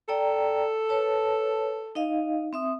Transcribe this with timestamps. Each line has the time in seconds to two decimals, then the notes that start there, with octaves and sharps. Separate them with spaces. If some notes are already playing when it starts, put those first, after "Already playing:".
0.09 A4 D5 G5 A#5
0.89 B4 C#5 A5
1.95 D#4 D#5 F5
2.53 C4 E5 D#6